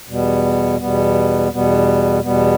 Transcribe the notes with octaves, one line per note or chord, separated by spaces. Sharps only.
E2 B2 G3 B3
E2 B2 G3 B3
E2 B2 G3 B3
E2 B2 G3 B3